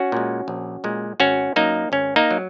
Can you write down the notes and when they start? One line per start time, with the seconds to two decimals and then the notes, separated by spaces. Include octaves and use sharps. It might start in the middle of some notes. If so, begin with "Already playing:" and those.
Already playing: C#4 F#4
0.12 A#2 G#3
0.48 A#1
0.84 A#2 G#3
1.20 G#1 C#4 F#4
1.56 F#2 F#3 A#3 D#4
1.92 G#1 C#4
2.16 A#3 D#4
2.31 F#3